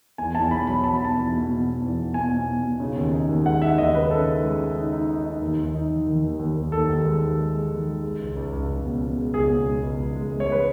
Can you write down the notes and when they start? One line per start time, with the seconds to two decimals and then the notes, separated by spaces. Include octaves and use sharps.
0.18 E2 G#5
0.35 E2 A5
0.51 B2 B5
0.67 F#3 B5
0.84 F#3 A5
0.94 B5
1.00 B2 A5
1.17 E2
1.33 B2
1.49 B2
1.65 B2
1.82 E2
1.98 E2
2.14 B2 G#5
2.31 B2
2.48 B2
2.64 B2
2.80 C#3
2.96 D#2
3.13 D#4
3.29 D#2
3.45 G#3 F#5
3.62 D#4 E5
3.78 D#2 D#5
3.95 C#3 B4
4.10 C#3 A4
4.27 D#4
4.43 G#3
4.60 C#3
4.76 D#4
4.92 D#4
5.09 D#4
5.25 D#4
5.41 D#2
5.58 D#2
5.75 D#4
5.90 D#3
6.07 D#3
6.23 D#2
6.39 D#2
6.56 D#2
6.72 D#2 A4
6.89 D#2
7.05 G#3
7.21 D#2
7.38 G#3
7.54 G#3
7.70 D#3
7.87 G#3
8.03 G#3
8.19 C#2
8.36 C#2
8.53 C#2
8.69 C#2
8.85 B2
9.01 B2
9.17 G#3
9.34 C#2 G#4
9.50 B2
9.67 G#3
9.83 C#2
9.99 C#2
10.15 G#3
10.32 G#3
10.40 C#5
10.48 G#3 B4